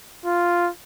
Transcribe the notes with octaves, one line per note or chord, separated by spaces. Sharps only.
F4